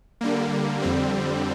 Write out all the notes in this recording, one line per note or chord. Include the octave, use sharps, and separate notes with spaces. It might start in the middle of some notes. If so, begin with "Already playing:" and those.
D3 G3 A#3
F2 D3 G3 C4